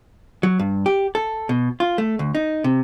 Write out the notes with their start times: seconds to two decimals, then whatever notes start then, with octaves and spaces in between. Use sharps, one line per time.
0.43 F#3
0.59 G2
0.86 G4
1.15 A4
1.49 B2
1.80 F4
1.98 A3
2.19 D2
2.35 D#4
2.64 C3